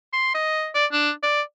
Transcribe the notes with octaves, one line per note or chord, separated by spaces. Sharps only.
C6
D#5
D5
D4
D5